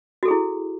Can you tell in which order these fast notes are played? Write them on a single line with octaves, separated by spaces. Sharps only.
F#4 A4 G#4 E4